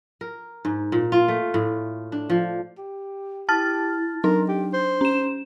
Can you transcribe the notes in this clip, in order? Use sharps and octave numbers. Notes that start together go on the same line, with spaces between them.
A#4
G#2
A#2
F4
A3
A2
D4
F3
G4
E4 G4 A5 F6 A6
F#3 D4 D#4 A#4
G4
C5
C#4 E7